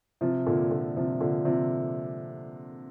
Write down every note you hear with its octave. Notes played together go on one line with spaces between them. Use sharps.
C3 F3
A#2 D3
A#2 D3
C3 F3
A#2 D3
C3 F3